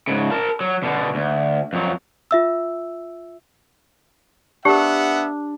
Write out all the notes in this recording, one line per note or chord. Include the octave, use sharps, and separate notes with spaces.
G#2 C#3
A#4 A5
F#3
B2 D3
D2
F2 F#3
F4 E5 E6
B3 D4 G4 A#4 E5 F#5